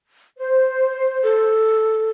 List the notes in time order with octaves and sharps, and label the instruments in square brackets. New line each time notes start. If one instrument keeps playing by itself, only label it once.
[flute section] C5
[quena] A4